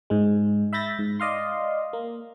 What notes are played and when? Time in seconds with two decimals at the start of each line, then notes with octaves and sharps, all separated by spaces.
0.10 G#2 G#3
0.73 E5 B5 G6 A6 A#6
0.99 G#2
1.20 D5 D#5 F5 C6
1.93 A#3